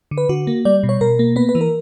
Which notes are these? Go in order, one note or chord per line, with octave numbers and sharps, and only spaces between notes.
D3
B4
D3 F#4
A#3
G3 D5
B2
C#5
B2 A#4
A#3
B3 B4
B4
E3
A#4